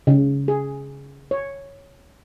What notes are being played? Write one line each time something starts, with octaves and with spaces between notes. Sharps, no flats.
C#3
G#4
C#5